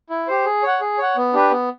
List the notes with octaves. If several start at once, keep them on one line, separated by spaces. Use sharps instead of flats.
E4
G4 C5
G#4
C#5 F#5
G#4
C#5 F#5
B3
D4 G4 B4
B3